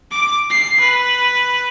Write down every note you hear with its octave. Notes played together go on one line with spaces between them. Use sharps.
D6
C7
B4